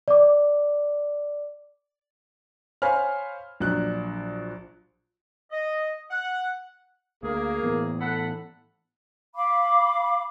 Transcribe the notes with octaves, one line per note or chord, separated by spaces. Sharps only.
D5 D6
C5 C#5 F5 G#5 B5 F6
A#1 F#3 D4 F#6
D#5
F#5
D2 A#3 G#4
A2 E3 B3
A4 F#5 B5
F5 B5 D6